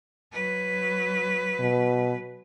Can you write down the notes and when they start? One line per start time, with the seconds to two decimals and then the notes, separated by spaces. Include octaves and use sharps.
0.32 F#3 B4
1.59 B2